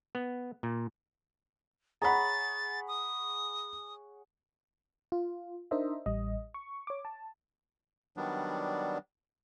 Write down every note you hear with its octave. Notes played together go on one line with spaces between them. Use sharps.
B3
A#2
G#4 C#5 F#5 A#5 B5 A6
D#6
F4
D4 D#4 A#4 C5 D#5 E5
A1 G3 D#5
C#6
C#5 D6
A5
D#3 F#3 G3 B3 D4